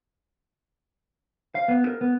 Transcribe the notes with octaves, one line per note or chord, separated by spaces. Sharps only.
F5
B3
A#4
B3